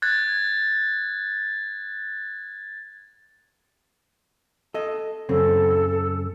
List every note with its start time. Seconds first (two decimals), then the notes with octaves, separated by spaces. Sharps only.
0.02 F#6 G#6 A6
4.74 A4 D#5
5.29 F#2 C#3 C4 A4